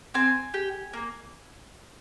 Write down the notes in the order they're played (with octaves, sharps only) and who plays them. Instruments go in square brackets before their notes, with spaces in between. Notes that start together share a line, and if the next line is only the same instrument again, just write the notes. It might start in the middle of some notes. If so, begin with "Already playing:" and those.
[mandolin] C4 G#5
G4
A#3